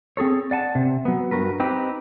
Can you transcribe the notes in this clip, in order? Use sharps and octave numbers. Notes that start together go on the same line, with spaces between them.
C4 G#4 A4 C#5
D5 F#5 G#5 A5
C3
F#3 B3
G2 G3 F#4 A#4 B4
C4 D#4 G4 B4